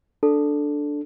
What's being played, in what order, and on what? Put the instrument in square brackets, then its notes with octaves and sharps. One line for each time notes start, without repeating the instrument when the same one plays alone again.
[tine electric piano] D4 [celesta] A4